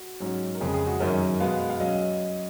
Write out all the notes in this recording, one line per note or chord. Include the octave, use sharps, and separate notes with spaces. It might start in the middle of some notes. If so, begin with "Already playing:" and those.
Already playing: F#4
G#2 F#3 C#4
A#4
F2 C#3 G#3 G#4
G#4
F#4
F#2 D#3 F#3 C#4 A#4
B2 G#3 B3 F5
F5
F#3 C#4 D#5